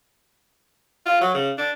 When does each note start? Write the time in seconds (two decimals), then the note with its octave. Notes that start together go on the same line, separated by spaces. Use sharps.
1.06 F4
1.21 F#3
1.34 C#3
1.58 D4